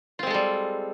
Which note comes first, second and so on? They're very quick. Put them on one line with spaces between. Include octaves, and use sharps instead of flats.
F4 C4 G#3 A4 G3